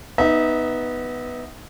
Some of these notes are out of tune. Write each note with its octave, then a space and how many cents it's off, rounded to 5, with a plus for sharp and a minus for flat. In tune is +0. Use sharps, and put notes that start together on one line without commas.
B3 +0 D#4 +0 E5 -30